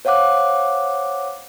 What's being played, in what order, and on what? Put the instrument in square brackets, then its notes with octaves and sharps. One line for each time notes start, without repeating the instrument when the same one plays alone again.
[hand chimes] C5 C#5 F5 F#5 D6 F#6